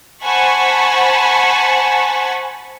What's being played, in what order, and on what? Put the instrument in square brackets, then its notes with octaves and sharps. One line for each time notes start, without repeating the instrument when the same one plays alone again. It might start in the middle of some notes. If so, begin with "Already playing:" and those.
[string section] C5 F#5 G#5 A5 B5 C#6